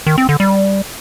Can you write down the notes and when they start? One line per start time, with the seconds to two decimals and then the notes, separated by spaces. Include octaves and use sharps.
0.07 D#3
0.18 C4
0.29 D3
0.40 G3